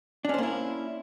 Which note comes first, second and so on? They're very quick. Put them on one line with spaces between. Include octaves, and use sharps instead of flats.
D4 C#4 C5 A#3 E4